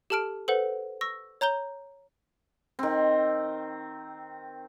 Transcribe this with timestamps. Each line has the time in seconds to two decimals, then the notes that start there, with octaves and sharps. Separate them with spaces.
0.10 G4 A4 A5 F6 D7
0.48 A4 B4 C5 F#5
1.01 C#6 E6 A#6
1.41 C#5 A#5 G6 G7
2.79 D#3 C4